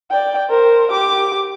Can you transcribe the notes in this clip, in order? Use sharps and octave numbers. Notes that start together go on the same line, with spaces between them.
D5 G5
A#4 C5
G4 D6